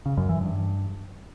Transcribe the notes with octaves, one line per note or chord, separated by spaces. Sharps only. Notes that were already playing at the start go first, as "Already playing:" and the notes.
C#3
F#2
E3
G2